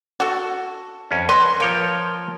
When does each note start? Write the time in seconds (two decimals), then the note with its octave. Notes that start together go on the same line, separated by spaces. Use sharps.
0.20 F#4 A4
1.11 F2 C#4
1.29 B4 D#5 C6
1.60 F3 A#3 C#5 G5